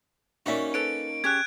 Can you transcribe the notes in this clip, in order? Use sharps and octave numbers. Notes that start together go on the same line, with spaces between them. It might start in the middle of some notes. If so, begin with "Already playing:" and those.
A#3 C#4 D#4 F#4 D5 E5
A4 B4 C#5 D7
C#4 G4 G#4 F#6 G#6